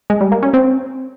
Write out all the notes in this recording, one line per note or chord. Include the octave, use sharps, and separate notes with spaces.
G#3
G3
A#3
C#4
C4